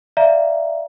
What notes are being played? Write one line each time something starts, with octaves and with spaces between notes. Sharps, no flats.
D5 E5 F5 A#5